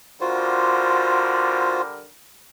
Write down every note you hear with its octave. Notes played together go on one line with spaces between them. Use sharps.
D3 G3 F4 F#4 A#4 C5